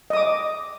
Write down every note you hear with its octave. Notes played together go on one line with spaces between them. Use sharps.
D#5 D6 D#6